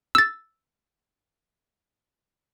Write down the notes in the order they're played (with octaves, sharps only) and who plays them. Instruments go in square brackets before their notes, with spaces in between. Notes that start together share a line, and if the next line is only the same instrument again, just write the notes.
[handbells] E6 A6